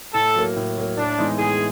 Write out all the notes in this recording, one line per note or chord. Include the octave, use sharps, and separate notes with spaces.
A2 A4
F#3 A#3
A2
F#3 A#3
A2 D4
E3 G#3 B3 D#4
A2 G#4